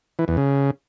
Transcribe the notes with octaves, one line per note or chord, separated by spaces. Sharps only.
E3
E2
C#3